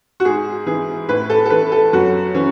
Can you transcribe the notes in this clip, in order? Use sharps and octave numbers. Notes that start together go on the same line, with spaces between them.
F#4
G#2 G#4
E3 G#4
A2 B4
A4
A4
E3 B4
A4
F#2 F#4
E3 C#4